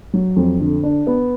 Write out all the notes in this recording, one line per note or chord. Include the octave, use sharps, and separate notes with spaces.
F#3
F2
D3
D4
B3